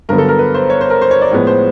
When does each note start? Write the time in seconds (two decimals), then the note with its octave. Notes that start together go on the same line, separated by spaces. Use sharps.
0.09 G2 D3 F#3 B3 A#4
0.18 A4
0.29 A#4
0.39 B4
0.54 C5
0.70 C#5
0.81 C5
0.90 A#4
1.02 C5
1.11 C#5
1.22 D5
1.31 A2 F3 G#3 B3 C#5
1.47 C5